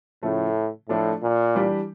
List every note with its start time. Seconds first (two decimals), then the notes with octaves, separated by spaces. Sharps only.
0.23 A2 C#3 F3 A3
0.89 A2 F3 A3 D4 F4 A4
1.23 A#2
1.55 E3 G3 D4 G4